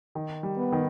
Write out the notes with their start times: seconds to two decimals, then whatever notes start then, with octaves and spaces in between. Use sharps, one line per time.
0.15 D#3
0.43 G3
0.58 B3
0.72 D#3